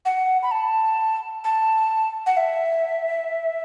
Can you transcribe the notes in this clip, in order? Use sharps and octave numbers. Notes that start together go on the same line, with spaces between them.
F#5
B5
A5
A5
F#5
E5